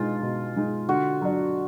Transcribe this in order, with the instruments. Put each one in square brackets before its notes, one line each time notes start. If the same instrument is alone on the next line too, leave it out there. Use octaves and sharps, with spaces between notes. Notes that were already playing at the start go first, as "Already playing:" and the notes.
Already playing: [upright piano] B2 G#3 D#4 [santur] F4
[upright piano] B2
G#3 D#4
[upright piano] D3 [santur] F#4
[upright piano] F#3 D4